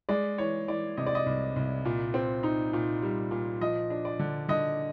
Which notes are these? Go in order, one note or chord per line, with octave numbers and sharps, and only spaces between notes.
G#3 D5
E3 C#5
E3 D5
C3 D#5
D5
D#5
C2
C2
A#2
C4
D#4
A#2
G3
A#2
F3 D#5
D4
D5
D3
D3 D#5